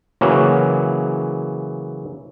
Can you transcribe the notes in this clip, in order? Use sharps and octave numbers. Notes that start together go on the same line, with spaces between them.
C#3 E3 F#3 A#3